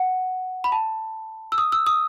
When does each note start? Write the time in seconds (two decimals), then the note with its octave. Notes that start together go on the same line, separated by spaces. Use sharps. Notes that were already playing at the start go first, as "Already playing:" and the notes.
Already playing: F#5
0.64 B5
0.72 A5
1.52 E6
1.58 D#6
1.72 E6
1.86 D#6